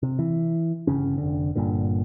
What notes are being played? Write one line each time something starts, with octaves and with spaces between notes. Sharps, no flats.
C3
E3
G1 C#2 C#3 C#4
F1 D3
G1 G2 A#2 D3